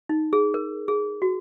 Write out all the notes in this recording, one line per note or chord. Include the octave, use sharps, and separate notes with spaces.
D#4
G#4
A#4
G#4
F#4